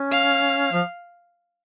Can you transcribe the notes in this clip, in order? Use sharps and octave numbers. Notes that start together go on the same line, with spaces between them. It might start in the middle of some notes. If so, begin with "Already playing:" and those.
Already playing: C#4
F5
F3